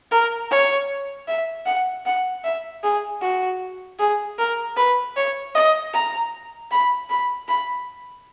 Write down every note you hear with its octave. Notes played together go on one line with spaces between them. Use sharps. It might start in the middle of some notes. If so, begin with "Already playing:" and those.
A#4
C#5
E5
F#5
F#5
E5
G#4
F#4
G#4
A#4
B4
C#5
D#5
A#5
B5
B5
B5